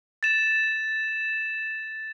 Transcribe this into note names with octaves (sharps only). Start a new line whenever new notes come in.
A6 E7